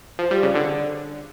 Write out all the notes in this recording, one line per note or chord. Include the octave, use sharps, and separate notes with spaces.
F3
G3
C#3
D3